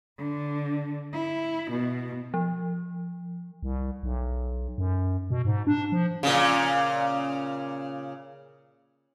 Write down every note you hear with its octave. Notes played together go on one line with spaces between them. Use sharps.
D3
E4
B2
F3
C2
B1
F#2
B2
G#2
D4
F3
A#2 C#3